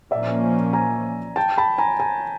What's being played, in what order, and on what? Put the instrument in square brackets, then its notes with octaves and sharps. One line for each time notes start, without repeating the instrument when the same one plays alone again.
[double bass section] A#2 F3 A#3 C#4 [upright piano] D5 E5
[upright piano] G#5 A#5
G5 A5
A5 B5
G#5 A#5
G#5 A#5